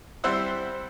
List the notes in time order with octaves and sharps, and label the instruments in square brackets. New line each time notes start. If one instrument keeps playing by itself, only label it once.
[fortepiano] G3 C4 E4 C5 F#5 E6